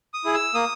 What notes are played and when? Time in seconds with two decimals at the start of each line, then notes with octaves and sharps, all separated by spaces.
0.14 D#6
0.24 E4 G#4
0.34 E6
0.54 A#3 D#6